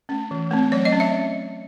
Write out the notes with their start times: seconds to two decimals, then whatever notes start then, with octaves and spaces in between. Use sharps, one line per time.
0.09 A3 C#4
0.31 E3
0.51 A3 C4
0.72 F#3 C#5
0.85 D#5
0.92 C#4
1.00 E5